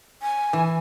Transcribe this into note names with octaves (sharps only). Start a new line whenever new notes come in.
G#5
E3